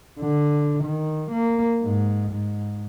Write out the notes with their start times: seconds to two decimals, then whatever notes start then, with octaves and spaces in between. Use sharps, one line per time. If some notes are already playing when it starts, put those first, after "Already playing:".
0.20 D3
0.84 D#3
1.32 A#3
1.83 G#2
2.32 G#2